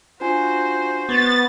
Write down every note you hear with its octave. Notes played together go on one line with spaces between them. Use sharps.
D4 F4 F#4 C5 G#5
B3 C#6 G#6 A6